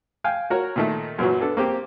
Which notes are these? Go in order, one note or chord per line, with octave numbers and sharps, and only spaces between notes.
F5 G5 G#5
F#4 A#4 C#5
A#2 D#3 A3
F#2 A#2 E3 F#3
B3 D4 A4
A#3 C4 G4